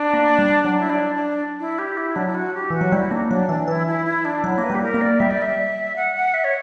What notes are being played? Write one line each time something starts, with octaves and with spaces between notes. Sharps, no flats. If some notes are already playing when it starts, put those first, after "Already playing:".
Already playing: D4
A#3
G3
F#3 D4
E4
D4
D4
E4
G4
E4
F#3 D4
E4
F#4
G4
E3 F#4
F#3
G3 E4
A#3 D4
F#3 D4
E3 D4
E3 E4
E4
E4
D4
F#3 E4
A#3
B4
G3
G4
A#4
A#3
D5
G3 E5
D5
E5
F#5
F#5
E5
C#5